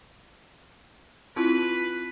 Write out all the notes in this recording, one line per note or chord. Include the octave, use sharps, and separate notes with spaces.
C4 E4 F4 B4